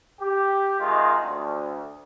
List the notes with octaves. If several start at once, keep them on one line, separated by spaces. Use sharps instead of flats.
G4
C3 D#3 G#3 F4
D2